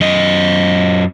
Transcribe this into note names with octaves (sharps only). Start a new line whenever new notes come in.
F#2 D#5